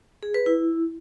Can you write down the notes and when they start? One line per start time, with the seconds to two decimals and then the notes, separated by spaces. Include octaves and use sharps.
0.23 G#4
0.34 B4
0.46 E4